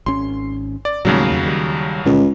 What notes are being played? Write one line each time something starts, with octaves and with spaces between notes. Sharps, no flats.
G#1 C#4 C6
D5
D#2 A2 C#3 F#3 G3 A3
E2
D#3 G3
C#2 A#2 D3